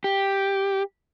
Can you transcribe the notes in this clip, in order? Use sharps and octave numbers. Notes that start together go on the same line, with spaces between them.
G4